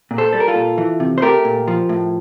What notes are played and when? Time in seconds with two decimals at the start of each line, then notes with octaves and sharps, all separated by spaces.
0.11 A#2
0.18 A4 C5
0.33 G3 A4
0.40 A#4
0.48 F4 A4
0.55 A#2
0.78 E3
1.00 C3
1.18 C5
1.22 A3 G4 A#4
1.45 A#2
1.68 F3
1.89 A2